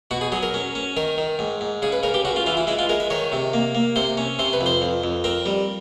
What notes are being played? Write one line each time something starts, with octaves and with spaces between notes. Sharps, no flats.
B2 F#4
G#4
F#3 G#4
A#4
C#4
C#4
D#3 A#4
D#3
G#2
G#2
C#3 G#4
B4
C#3 A#4
G4
C#3 F#4
F4
E3 F4
E4
G#3 E4
F4
G#3 A#4
E5
D#3 C#5
C3
A#3
A#3
C3 C5
C#4
C3 C5
B4
F2
C5
F2
F2
C4 A#4
G3